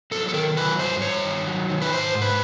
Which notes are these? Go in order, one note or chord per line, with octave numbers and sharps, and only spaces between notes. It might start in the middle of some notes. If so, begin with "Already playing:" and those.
F#3 A4
A4
D#3 A#4
F#3 B4
G2 C5
G2 C#5
D#3
F#3
D#3
B4
G#2 C5
G#2
B4